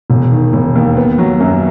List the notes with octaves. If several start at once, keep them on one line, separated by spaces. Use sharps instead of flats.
E1
D#3
E1
D#2
B3
F#3
F#2